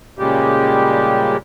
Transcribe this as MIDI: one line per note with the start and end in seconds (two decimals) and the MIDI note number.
0.19 1.37 46
0.19 1.37 49
0.19 1.37 55
0.19 1.37 56
0.19 1.37 67